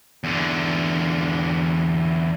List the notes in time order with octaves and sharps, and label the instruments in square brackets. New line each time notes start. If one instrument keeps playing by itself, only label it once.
[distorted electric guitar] E2 D3